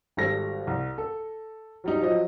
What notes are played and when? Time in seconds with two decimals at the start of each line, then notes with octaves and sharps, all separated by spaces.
0.17 G#1 G3 A4 A#6
0.67 C2
0.98 A4
1.84 F#3 G3 D#4
2.02 F3 F#3 D#5